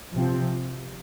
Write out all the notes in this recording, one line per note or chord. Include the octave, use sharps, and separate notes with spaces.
C3 F3 C4